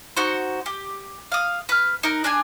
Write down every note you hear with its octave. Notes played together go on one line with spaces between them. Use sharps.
D#4 F#4 C5
G4
F5 D#6
B4 F6
D#4 A#4 B4
D4 G#4 G#5